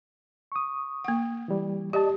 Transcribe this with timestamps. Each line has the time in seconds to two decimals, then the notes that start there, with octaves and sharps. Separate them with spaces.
0.52 C#6 D#6
1.05 A#3 F#5
1.48 E3 G3
1.93 G4 D5 D#5 A5